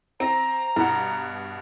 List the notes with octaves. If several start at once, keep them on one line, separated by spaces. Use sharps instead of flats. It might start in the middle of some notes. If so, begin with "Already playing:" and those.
C4 A#5
G2 B2 F#5